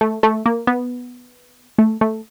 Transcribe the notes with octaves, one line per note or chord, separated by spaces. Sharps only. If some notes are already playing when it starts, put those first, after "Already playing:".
A3
A3
A#3
B3
A3
A3